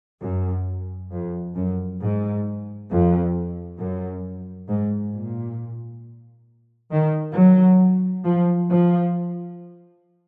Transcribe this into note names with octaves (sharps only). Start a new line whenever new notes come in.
F#2
F2
F#2
G#2
F2
F#2
G#2
A#2
D#3
F#3
F3
F3